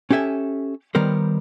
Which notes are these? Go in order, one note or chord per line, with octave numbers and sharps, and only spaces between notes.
C#4 G4 A4 E5 G#5
D#3 G3 B3 A#4 C5